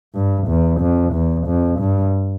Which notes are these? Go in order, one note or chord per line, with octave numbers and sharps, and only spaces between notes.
G2
E2
F2
E2
F2
G2